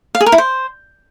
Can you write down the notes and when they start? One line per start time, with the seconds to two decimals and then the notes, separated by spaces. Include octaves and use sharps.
0.15 F5
0.21 G#4
0.26 A#4
0.32 E4
0.38 C5